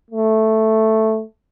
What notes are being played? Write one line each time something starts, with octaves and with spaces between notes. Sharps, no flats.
A3